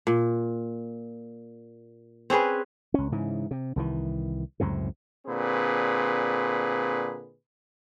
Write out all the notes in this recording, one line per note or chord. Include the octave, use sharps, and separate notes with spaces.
A#2
C4 C#4 G#4 B4
C#2 C#4
G#2 C#3 E3
C3
C2 D#3 E3
C#2 F#2 A2 C3
A#2 D3 C4 G#4 B4